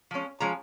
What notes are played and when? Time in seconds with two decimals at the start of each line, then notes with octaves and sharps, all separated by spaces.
0.11 F3 G#3 C#4
0.40 F3 G#3 C#4 A#5